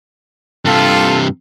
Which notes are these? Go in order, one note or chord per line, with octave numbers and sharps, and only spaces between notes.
G2 C3 F4 A4